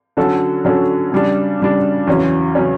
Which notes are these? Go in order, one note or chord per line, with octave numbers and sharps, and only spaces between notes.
D3 F#3 C#4 F#4 A4
D3 F#3 C#4 F#4 A4
C#3 G3 D4
C#3 G3 D4
E2 C#3 F#3 C#4
C#3 F#3 C#4